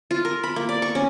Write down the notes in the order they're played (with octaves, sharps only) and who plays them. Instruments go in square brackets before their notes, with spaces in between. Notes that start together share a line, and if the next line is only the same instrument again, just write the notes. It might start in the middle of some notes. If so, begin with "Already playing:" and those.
[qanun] F4
A#4
B5
A#3
D5
C#6
C#4